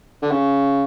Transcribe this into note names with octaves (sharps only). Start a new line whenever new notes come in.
D3
C#3